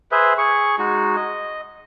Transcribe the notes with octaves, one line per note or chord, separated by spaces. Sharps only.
G#4 B4 C5 E5
G#4 C#6
G#3 D#4 F#4
D#5